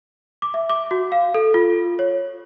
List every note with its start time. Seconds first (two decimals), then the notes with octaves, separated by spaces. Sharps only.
0.42 D6
0.54 E5
0.70 D6
0.91 F#4
1.12 F5
1.34 A4
1.54 F4
1.99 C#5